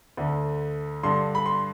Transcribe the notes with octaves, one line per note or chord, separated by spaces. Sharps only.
D2 D3
G2 D3 C6
B5
C6